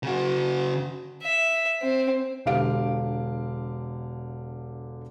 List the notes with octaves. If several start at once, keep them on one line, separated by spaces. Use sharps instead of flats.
C#3 F#4
E5
C4
E1 D3 G4 F5 D7